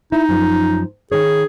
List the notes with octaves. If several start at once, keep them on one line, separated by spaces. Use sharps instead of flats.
D#4 E4
F#2 F3
D#3 D#4 G#4 C#5